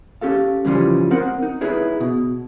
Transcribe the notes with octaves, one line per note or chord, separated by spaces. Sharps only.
C#4 G4 A4 F5
G2 C#3 E3 F3 G3 C#4
C4 A#4 C5 F#5
D#4
D#4 E4 G#4 B4 C#5
B2